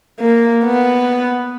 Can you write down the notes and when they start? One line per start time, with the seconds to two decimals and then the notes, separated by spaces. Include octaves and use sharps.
0.20 A#3
0.64 B3